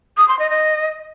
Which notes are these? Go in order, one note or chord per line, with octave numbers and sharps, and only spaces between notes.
D#6
C6
D#5
D#5